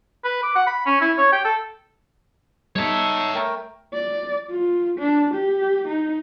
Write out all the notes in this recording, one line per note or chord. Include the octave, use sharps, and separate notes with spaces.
B4
D6
F#5
B5
C#4
E4
C#5
G5
A4
G3 B3 D#4 A4 C#5 E5
A3 A#4 G5
D5
F4
D4
G4
D#4